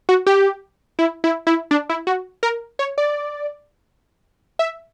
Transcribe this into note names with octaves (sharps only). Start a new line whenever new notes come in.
F#4
G4
E4
E4
E4
D4
E4
F#4
A#4
C#5
D5
E5